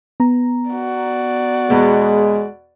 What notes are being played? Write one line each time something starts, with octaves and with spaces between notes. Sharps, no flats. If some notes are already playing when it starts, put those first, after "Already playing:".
B3 A#5
F#4 D5
E2 B2 G#3